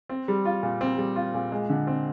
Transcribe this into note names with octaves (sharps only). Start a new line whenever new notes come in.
C4
G3
F4
A#2
C4
G3
F4
A#2
G#3
D3
C4